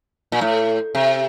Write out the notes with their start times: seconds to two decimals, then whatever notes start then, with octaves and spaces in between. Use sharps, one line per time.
0.32 A#2
0.41 A2
0.95 C3